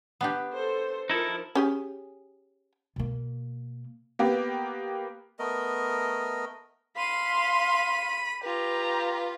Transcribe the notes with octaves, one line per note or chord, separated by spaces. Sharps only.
B3 D4 G4
A4 C5
F3 D#4 E4 A4 A#4
C#4 G4 G#4
B2 A#3
A#3 B3 G4
A3 B3 A#4 D#5
F5 B5 C6 D#7
F4 G4 B4 A#5